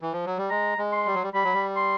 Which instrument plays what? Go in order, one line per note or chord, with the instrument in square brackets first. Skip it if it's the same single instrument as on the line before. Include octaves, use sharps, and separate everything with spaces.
[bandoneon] E3
F3
F#3
G3
[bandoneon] G#3 [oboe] A#5
[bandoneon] G#3
[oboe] C6
[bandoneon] G3
F#3
G3
[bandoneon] G3 [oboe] B5
[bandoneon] F#3
G3
[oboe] C6